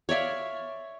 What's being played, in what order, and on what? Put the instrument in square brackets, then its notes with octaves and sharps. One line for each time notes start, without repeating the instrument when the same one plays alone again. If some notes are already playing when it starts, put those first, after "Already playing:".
[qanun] C#5 D5 E5 F5